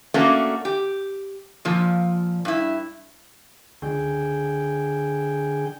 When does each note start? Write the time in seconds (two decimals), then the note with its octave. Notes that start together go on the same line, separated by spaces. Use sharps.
0.14 A3 A#3 C#4 D4 F#4
0.65 G4
1.65 A#2 F3
2.45 G2 E4
3.82 C#2 D3 G#4 G5